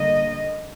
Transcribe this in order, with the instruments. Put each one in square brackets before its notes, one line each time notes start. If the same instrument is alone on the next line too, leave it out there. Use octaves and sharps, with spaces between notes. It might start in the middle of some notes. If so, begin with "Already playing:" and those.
Already playing: [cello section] D3 G3 A#3 D#5